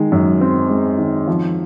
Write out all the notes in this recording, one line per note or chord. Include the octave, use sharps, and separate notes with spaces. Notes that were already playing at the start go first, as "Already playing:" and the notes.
Already playing: D#3 G#3
F#2
C4
G#3
D#3
F3